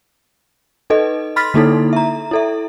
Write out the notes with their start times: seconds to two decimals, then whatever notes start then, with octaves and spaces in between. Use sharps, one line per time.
0.90 D#4 A4 B4 D#5
1.36 B5 C6 F6 A6 B6
1.54 D3 A#3 D#4 E4 A4
1.93 E5 A#5
2.31 E4 A4 E5